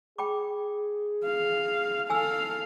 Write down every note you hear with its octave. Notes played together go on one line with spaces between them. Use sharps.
G#4 G5 B5 D6
F5
A4 F5 G#5 E6